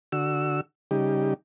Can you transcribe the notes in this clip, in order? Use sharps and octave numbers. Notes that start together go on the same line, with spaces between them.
D3 F#4 E6
C#3 G3 D#4 G4